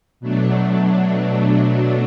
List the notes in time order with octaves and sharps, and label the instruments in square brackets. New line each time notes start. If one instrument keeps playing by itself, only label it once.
[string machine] B2 F#3 A3 D4